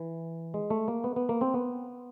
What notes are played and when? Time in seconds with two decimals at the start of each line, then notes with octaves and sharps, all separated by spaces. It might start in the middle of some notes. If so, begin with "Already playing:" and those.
Already playing: E3
0.54 G#3
0.70 A3
0.88 A#3
1.04 B3
1.16 B3
1.29 A#3
1.41 C4
1.54 B3